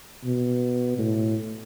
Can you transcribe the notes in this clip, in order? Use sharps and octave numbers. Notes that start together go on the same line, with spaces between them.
B2
A2